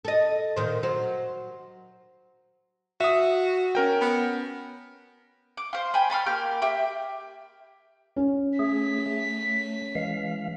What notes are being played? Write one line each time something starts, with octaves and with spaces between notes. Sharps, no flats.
A4 D#5
A#2 D#3 C5
F#3 C5
F#4 E5 D#6
C#4 A#4 G5
B3
D6
F4 C5
G5 G#5 B5
A5 B5 C6 F6
A#3 G4 F6 G6
G4 E5
C#4
A3 G#4 B6
A3
E3 G#3 F5